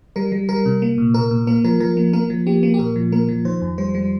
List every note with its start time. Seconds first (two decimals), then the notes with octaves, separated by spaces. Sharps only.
0.16 G3 A#4
0.32 G3
0.49 G3 A#4
0.66 C3
0.82 A#3
0.98 A#2
1.14 A#2 A#4
1.31 A#2
1.47 A#3 A#4
1.64 F3 A#4
1.80 F3 A#4
1.97 A#3
2.13 A#3 A#4
2.30 F3
2.47 A#3 G4
2.63 A#3
2.74 G4
2.79 A#2 A#4
2.96 F3
3.12 A#3 A#4
3.29 F3
3.45 D#3 C5
3.62 F2
3.78 G3 C5
3.95 G3